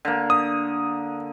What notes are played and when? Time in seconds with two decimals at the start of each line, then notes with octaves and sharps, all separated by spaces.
0.05 D3 A#3
0.30 D#6